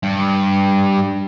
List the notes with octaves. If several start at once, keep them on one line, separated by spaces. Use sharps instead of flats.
G2